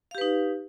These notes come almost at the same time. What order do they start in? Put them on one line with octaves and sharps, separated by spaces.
F5 G4 B4 D#4